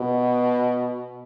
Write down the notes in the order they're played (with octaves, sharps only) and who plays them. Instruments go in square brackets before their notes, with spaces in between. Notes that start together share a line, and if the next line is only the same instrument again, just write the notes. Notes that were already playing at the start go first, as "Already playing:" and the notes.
Already playing: [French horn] B2